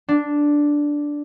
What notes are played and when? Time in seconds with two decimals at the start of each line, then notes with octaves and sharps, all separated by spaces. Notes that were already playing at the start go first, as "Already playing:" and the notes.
0.09 D4